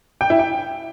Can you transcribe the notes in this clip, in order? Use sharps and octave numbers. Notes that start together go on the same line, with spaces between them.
G5
E4
G5